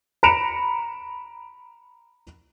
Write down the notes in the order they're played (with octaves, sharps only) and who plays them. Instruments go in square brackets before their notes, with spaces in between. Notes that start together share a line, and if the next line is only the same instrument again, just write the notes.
[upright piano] A#5 B5 C#7 D7 E7 F7